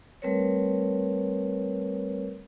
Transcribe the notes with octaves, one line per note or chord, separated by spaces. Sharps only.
G3 A3 C4 A#4 B4 C#5